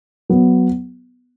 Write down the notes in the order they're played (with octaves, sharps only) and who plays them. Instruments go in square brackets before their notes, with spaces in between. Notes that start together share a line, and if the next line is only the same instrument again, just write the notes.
[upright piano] F#3 B3